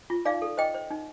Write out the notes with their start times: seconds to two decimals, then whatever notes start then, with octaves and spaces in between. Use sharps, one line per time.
0.10 F4
0.25 D#4 D5 F5
0.42 A4
0.57 C5 D#5 G5
0.74 C5
0.91 D#4